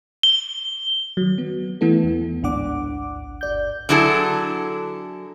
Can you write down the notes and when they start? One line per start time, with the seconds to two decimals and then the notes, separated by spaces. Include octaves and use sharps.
0.23 G7
1.17 D#3 F#3
1.38 B3
1.81 E3 A3 B3 E4 A4
2.04 E2
2.42 A1 D2 G#2 D4 F#5 D6
3.41 G1 D5 G6
3.89 D3 F#3 E4 G#4 A4